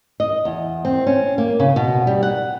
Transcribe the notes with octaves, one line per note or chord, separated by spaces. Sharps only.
D#5
E2
C4
C#4
A#3
C#3
B2
G3
F#5